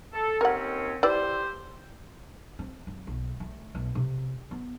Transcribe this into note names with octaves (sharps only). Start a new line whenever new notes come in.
A4
D#2 C4 C#4 A#4 F#5
E4 G4 B4 C5 D5
C4
F#2
B1
A3
B1
C3
B3